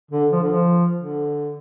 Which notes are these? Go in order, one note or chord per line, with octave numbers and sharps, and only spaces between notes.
D3
F3
D3
F3
D3